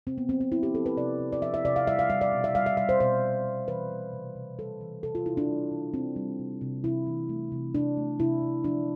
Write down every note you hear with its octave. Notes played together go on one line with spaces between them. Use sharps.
C3 C4
B3
F3 C4
C4
F3 E4
G4
F3 A4
B4
C3 D5
C3
D5
F3 E5
E5
C3 D5
F5
G3 E5
F5
G3 E5
D5
B2
E5
G3 F5
E5
G3 E5
C5
B2 C5
G3
B2
E3 B4
G3
C3
C3
G3 A4
E3
C3 A4
F4
C3 E4
D4
G3
E3
C3 C4
G3
C3
C3
C3 E4
E3
A3
C3
C3 D4
A3
C3 E4
C3
F3 D4